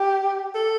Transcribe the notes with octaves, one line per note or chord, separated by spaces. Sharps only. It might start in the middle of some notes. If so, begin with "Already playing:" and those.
Already playing: G4
A4